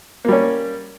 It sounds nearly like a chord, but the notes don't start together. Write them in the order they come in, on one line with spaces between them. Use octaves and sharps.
A#3 G3 C#4